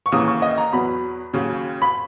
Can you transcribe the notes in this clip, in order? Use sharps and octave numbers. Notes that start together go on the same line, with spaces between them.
C#6
D#2 C#3 E3 A#3 D#6
C#6
D#5
A#5
E2 B2 F#3 B3 B5
D#2 C#3 F#3
B5